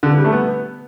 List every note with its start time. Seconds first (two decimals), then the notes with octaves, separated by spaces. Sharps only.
0.03 D3
0.10 E3
0.17 G3
0.25 A3
0.32 B3